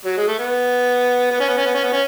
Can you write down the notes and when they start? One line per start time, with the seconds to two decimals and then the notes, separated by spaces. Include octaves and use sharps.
0.05 F#3
0.17 G#3
0.28 A3
0.39 B3
1.31 B3
1.40 C#4
1.48 B3
1.57 C#4
1.66 B3
1.75 C#4
1.84 B3
1.92 C#4